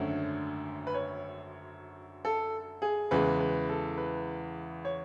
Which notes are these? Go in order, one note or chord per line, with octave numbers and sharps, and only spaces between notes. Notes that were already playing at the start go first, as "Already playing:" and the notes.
Already playing: G#1 F#2 D3 A3 C#4
B4
C#5
A4
G#4
E2 C#3 E3 G#3 B4
B4
A4
B4
C#5